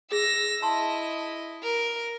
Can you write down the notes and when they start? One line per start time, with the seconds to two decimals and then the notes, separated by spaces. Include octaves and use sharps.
0.12 G#4 E6 A#6
0.62 E4 D#5 A5 C6
1.63 A#4